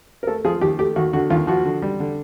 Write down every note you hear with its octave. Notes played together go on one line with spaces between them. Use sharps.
A#4
A3 A4
F3 G#4
D#2 G4
A3 G4
D#2 F#4
D3 F#4
D#2 F4
F3 F#4
D3
G3
D3